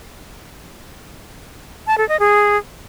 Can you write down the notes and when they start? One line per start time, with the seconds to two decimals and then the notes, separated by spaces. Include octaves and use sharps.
1.87 A5
1.98 A4
2.09 D#5
2.20 G#4